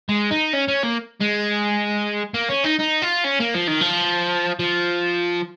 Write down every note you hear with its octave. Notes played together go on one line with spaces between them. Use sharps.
G#3
D#4
C#4
C#4
A#3
G#3
A#3
C#4
D#4
D#4
F4
C#4
A#3
F3
D#3
F3
F3